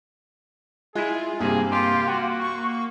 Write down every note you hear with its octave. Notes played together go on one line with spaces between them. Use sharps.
G#3 E4 F4 G#4
G2 C3 A#3 G#4
F4 G4
F#4 G5
C#6